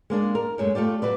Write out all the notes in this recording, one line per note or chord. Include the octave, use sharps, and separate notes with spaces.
G#3 A#3 D4
A#4
F#2 G#3 A3
A3 F4 G4 D5
F#3 B4 D5